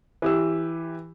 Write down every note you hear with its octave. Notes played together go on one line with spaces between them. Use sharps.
E3 G4 E6